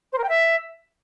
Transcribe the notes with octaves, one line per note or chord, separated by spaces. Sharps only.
C5
A#4
G5
E5